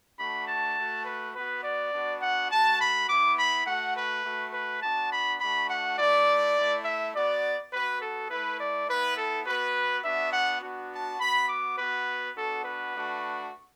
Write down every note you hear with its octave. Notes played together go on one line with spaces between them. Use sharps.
A3 D4 F#4 B5
A5
A3 F#4
B4
B3 F#4 B4
D5
B3 D4 F#4
F#5
A3 F#4 A5
B5
B3 E4 D6
B5
A3 F#4 F#5
B4
A3 F#4
B4
B3 D4 F#4 A5
B5
A3 D4 F#4 B5
F#5
A3 E4 D5
A3 E4
E5
B3 F#4 D5
B3 F#4 B4
A4
A3 E4 B4
D5
B3 E4 B4
A4
B3 F#4 B4
B3 D4 F#4 E5
F#5
B3 D4 F#4
A5
B3 F#4 B5
D6
B3 F#4 B4
B3 D4 F#4 A4
B4
A3 D4 F#4